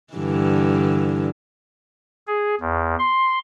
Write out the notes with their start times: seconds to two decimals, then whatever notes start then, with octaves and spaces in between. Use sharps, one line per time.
0.14 G2 D3 E3
2.27 G#4
2.61 E2
2.99 C6